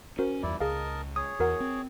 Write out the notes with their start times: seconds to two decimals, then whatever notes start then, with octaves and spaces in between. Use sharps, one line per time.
0.19 C#4 F#4 A#4 C5
0.43 E2 G2 E4 D5
0.60 C#2 G#4 A#4 D#5 F5 A5
1.16 G#4 C#5 D#6
1.40 E2 F#4 A#4 F#5
1.60 C4